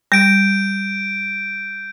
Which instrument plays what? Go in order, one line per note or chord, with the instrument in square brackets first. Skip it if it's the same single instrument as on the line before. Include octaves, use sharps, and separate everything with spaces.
[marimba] G3 [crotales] G6 D7